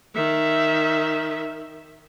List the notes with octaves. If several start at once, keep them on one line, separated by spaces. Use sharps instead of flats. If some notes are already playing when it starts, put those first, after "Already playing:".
D#3 E5